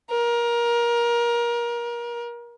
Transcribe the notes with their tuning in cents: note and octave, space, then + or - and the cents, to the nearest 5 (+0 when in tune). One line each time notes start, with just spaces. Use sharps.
A#4 +25